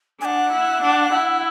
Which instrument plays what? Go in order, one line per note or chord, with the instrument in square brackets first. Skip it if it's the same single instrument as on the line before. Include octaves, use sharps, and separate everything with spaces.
[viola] D4 [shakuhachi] G#5
[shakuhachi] F#5
[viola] E4
D4
E4